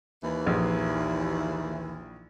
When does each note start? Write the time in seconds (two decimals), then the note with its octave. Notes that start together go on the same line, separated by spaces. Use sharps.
0.23 D#2 E3
0.47 A#1